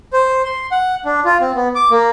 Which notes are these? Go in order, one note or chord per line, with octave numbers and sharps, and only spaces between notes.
C5
C6
F#5
D4
F4
C4
B3
D6
A#3